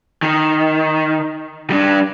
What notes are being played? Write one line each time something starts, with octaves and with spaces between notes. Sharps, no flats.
D#3
G3 D4